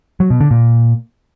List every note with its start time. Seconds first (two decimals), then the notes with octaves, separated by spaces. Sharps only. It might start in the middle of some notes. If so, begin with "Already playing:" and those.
0.20 F#3
0.30 B2
0.41 D3
0.51 A#2